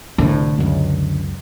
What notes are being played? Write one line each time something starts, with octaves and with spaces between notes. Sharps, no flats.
C2 A2 D3
C#2 F#2